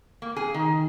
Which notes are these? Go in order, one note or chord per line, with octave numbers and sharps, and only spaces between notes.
A#3
G#4
D#3